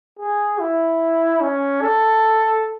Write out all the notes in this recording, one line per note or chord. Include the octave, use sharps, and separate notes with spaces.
G#4
E4
C#4
A4